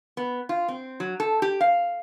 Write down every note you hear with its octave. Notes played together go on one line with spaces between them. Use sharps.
B3
F4
C4
F#3
A4
G4
F5